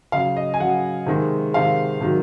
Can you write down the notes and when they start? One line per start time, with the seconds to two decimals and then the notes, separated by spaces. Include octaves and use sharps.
0.12 C#3 F#3 F5
0.37 D#5
0.54 G#5
0.60 C#3 F#3 F#5
1.06 C3 D#3 G#3
1.53 C3 D#3 G#3 F5
2.01 C3 D#3 F#3